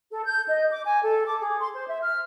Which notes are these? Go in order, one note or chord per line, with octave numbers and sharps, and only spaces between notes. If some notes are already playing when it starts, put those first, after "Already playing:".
A4
G6
D#5
D6
G#5
A4
D6
G#4
C6
C5
E5
F6